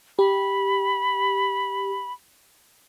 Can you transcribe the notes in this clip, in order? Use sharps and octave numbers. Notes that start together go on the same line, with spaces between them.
G4 B5